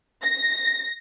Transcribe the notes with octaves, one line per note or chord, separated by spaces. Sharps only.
A#6